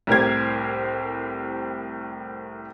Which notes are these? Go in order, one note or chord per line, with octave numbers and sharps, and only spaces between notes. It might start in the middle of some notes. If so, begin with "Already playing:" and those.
C2 A2 G4 A#4 C5 G#6